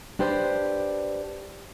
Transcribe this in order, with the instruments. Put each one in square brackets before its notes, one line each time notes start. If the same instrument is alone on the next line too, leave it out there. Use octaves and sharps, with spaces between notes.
[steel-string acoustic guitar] D4 G4 B4 C5